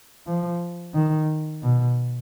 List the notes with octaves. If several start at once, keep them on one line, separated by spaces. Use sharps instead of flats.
F3
D#3
B2